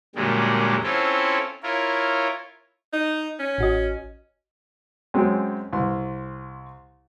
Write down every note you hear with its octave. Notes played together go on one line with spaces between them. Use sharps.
F#2 A#2 D3 G3 G#3
C4 C#4 E4 F4 A4
E4 F4 A#4 C#5
D#4
C#4
A1 F#4 D#5
F#2 G#3 C4 C#4
C2 C6